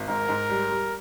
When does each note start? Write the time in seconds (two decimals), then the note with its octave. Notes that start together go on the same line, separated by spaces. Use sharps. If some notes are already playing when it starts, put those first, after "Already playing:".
Already playing: G#1
0.08 G#2 A#4
0.29 G#2
0.49 G3
0.70 G3